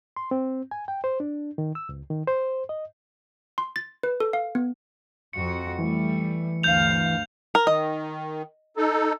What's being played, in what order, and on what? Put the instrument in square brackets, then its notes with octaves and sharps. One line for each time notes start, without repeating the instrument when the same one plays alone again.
[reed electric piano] C6
C4
G#5
G5
C5
D4
D#3
E6
C#2
D#3
C5
D#5
[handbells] C6
A6
B4
A4
F5
B3
[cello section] F2 F#4 [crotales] C#7
[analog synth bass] E3 [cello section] G3 A3
[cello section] D2 G2 F5 [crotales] G6 F7
[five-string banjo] A#4
[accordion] D#3 [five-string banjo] D#5
[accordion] D#4 A4